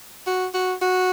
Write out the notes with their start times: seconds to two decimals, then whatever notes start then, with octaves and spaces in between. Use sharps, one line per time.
0.27 F#4
0.54 F#4
0.82 F#4